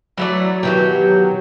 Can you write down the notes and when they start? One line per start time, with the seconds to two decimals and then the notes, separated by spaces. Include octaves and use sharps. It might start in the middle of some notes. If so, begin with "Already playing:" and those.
0.17 E3 F#3 A3 D5
0.63 B2 D#3 E3 F#4 G4 G5